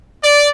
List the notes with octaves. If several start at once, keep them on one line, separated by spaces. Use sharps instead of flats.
D5